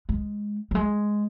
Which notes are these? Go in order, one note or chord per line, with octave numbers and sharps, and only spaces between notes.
G#3
F#3
G#3